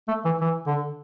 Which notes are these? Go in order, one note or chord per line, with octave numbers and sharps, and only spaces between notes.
A3
E3
E3
D3